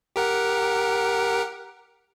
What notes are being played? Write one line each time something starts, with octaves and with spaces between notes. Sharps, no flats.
G4 A#4 F#5